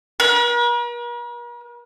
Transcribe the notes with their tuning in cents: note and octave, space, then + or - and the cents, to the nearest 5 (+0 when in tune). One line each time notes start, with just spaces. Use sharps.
A#4 +45